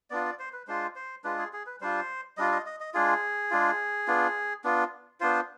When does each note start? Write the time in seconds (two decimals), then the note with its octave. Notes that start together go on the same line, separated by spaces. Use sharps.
0.10 B3 D4 F4 D5
0.25 D5
0.39 C5
0.53 B4
0.67 G#3 D4 F4 C5
0.96 C5
1.24 G#3 D4 F4 B4
1.38 G#4
1.53 G#4
1.66 B4
1.81 G3 D4 F4 C5
2.37 G3 D4 F4 D#5
2.52 D#5
2.66 D#5
2.80 D#5
2.94 G#3 D4 F4 G#4
3.51 G#3 D4 F4
4.07 B3 D4 F4
4.64 B3 D4 F4
5.20 B3 D4 F4 C5